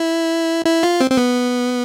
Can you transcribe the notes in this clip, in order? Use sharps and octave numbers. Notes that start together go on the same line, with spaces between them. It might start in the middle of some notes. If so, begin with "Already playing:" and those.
Already playing: E4
E4
F4
C4
C4
B3